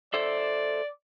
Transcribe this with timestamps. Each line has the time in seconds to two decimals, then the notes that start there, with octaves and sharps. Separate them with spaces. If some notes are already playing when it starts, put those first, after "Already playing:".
0.14 A4 C5 D5 E5